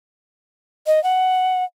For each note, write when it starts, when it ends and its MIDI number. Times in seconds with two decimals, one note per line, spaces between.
0.87 1.02 75
1.04 1.64 78